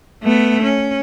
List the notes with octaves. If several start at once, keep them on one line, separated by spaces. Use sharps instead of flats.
A3 B3
C#4